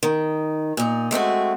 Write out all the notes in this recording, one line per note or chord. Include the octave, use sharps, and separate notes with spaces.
D#3
A#2 D#4
G#3 A3 C4 F#4